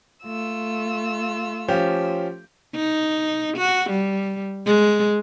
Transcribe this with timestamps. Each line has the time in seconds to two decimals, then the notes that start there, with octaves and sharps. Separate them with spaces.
0.24 A3 F4 E6
1.68 F3 C#4 G4
2.76 D#4
3.57 F#4
3.90 G3
4.66 G#3